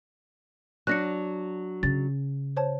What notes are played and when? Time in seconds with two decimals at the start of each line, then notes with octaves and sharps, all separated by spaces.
0.87 F#3 D4 F#6 A#6 C#7
1.83 C#3 A6
2.57 C5 C#5 A5